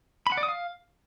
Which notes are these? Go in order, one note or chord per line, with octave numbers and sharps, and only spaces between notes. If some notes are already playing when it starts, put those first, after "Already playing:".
B5
F#5
D5
D#6
F5